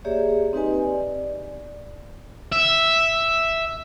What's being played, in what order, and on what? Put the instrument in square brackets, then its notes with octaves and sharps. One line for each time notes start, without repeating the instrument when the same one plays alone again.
[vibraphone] A#3 G4 G#4 C#5 D5 E5
C4 D#4 G4 B4 D#5 G#5
D5
[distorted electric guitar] E5